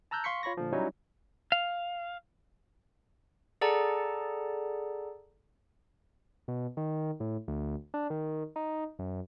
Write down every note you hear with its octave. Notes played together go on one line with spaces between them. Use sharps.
A5 A#5 E6 F#6 G6
F5 C6 C#6 B6 C#7
F4 C#5 B5 C#6 A#6
A#2 D3 F3
F#3 G3 C#4 D#4 E4 C#5
F5
G#4 A4 D5 F#5 A5 A#5
B2
D#3
A2
D2
D4
D#3
D#4
F#2